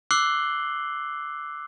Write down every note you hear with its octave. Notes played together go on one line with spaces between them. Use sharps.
D6 E6 F#6 C7 F#7 G7